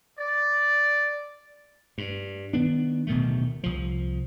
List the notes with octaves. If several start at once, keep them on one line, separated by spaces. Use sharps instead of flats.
D5
G2
D#3 B3 D4
D1 B2 D#3 A3
C2 F3